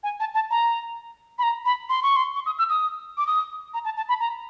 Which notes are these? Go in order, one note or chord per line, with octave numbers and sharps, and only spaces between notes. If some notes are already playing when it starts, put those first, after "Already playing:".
G#5
A5
A5
A#5
B5
A#5
B5
C6
C#6
C6
C#6
D#6
E6
D#6
D6
D#6
A#5
A5
A5
B5
A#5